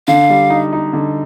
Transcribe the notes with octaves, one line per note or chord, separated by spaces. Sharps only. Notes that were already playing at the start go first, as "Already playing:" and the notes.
D3 F5
G3
D#4
D#4
D3